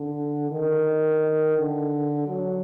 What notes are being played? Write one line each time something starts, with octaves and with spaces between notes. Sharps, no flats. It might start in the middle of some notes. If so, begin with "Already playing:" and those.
Already playing: D3
D#3
D3
F#3